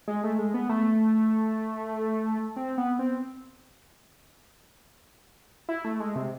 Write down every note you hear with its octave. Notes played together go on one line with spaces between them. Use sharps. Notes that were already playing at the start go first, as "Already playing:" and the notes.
G#3
A3
G#3
B3
A3
C4
B3
C4
E4
A3
G#3
C3